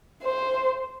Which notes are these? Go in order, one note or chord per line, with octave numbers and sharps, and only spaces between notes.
C5